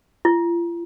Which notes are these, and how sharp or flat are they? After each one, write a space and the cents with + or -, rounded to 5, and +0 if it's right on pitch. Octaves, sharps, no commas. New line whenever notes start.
F4 -40